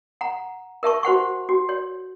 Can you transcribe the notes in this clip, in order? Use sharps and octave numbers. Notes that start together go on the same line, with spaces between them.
F#5 A#5
A#4 E5 A5 C#6
F#4 C5 F#5 C#6
F#4
C#5